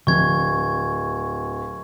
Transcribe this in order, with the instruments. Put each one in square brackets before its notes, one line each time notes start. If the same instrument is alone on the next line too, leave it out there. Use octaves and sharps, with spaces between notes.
[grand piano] D1 [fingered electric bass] D3 F3 C4 [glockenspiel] C#6 G#6